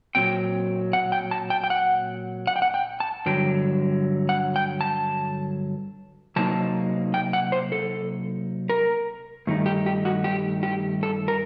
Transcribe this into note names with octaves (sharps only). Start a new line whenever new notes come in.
A#2 F#3 C4 G5
F#5
G5
A5
G5
G5
F#5
F#5
G5
F#5
G5
A5
G2 D3 F#3 G5
F#5
G5
A5
C3 F#3 A#3 D#4 A5
G5
F#5
C5
A4
A#4
G2 D#3 A3 D#4
G4
G4
F#4
G4
G4
A4
A#4